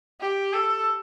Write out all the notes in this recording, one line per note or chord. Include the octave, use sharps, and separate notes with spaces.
G4
A4